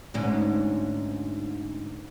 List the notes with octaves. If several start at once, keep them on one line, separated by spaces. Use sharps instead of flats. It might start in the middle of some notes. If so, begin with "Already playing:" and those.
D2 G#2 C#4